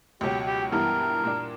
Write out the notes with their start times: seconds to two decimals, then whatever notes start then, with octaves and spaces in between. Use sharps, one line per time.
0.21 C#2 B2 F#3 G4
0.47 G4
0.72 G2 E3 B3 E4 G4 A#4
1.24 A#2 A#3 D4